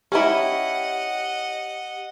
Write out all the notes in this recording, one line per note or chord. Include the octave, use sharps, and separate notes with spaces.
C#4 E4 G4 D#5 F#5